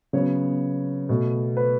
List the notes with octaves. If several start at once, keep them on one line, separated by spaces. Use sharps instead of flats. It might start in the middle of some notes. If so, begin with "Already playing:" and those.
C#3 F#3 B3 C#5
B2 A3
B4